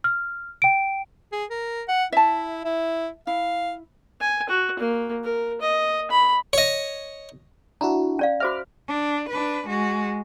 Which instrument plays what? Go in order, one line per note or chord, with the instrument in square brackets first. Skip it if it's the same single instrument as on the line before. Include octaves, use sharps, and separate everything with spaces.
[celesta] F6
G5 D7
[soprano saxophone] G#4
A#4
F#5
[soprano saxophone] E4 [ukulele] E5 A5
[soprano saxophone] E4
[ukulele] E4 [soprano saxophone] F5
[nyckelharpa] G#5
F#4
A#3
A#4
D#5
B5
[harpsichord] C#5 D#5
[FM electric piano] D4 E4 F#4 [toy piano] A#5
[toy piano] C#4 D5 F5
[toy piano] F#4 C5 E5 [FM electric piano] B5 D6 F6
[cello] D4
D4 B4
G#3 F#4